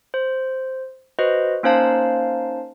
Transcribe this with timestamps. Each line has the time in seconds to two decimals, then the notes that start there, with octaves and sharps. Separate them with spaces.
0.14 C5
1.19 F#4 B4 C5 D#5
1.63 A#3 C#4 D#4 C5 F5 A5